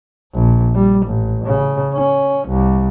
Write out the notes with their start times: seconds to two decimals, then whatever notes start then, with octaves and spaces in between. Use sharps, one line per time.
0.34 A#1
0.75 G3
1.06 A1
1.46 C#3
1.94 C#4
2.48 C2